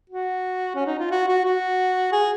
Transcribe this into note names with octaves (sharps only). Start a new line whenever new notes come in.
F#4
C#4
D#4
F4
F#4
F#4
F#4
G#4